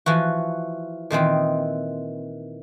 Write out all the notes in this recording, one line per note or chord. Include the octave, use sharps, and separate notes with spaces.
E3 F3 F#4
A#2 D#3 E3 C4